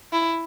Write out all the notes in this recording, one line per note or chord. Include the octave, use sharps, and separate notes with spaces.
E4